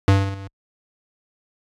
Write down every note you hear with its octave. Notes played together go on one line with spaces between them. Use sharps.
G2